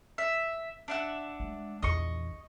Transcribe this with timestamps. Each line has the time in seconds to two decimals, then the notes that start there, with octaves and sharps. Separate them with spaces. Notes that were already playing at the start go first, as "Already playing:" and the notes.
0.18 E5
0.88 D4 E5 F#5
1.40 G#3
1.82 A#1 E2 D#5 C#6